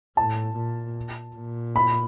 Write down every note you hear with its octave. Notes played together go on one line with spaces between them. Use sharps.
A2 A5
A#2
A#2
B5